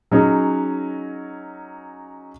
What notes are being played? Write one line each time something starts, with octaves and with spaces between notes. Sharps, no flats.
F#3 C#4 D#4 G#4